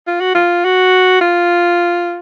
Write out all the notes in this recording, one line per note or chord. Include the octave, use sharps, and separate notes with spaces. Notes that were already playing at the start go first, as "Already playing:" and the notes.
F4
F#4
F4
F#4
F4